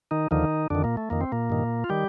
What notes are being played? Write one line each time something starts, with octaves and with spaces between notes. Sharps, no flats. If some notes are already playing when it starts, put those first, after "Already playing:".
D#3 D#4
D#2 D3 D#3 F3 D#4
F2 D3 D#3 D4
A#2 A#3
A3
F2 D#3 A#3
C4
A#2 A#3
G2 D#3
F4
D#3 G3 G4